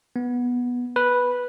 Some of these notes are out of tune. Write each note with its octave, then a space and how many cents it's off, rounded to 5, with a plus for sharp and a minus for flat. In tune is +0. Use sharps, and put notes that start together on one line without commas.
B3 -10
B4 -5